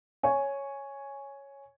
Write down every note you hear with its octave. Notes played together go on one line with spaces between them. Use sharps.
C#5 G#5